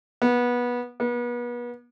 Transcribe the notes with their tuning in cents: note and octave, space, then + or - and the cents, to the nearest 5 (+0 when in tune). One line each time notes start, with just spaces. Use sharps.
B3 -20
B3 -35